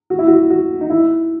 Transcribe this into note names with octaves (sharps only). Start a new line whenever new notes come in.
F#4
E4
F#4
F#4
D#4
E4